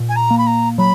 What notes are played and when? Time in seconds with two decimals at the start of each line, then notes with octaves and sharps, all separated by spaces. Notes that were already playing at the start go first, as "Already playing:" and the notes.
Already playing: A#2
0.08 G#5
0.15 A#5
0.30 A#3
0.38 B5
0.46 A#5
0.78 F#3 B5